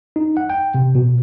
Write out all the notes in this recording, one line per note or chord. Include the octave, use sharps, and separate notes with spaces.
D#4
F#5
G5
C3
B2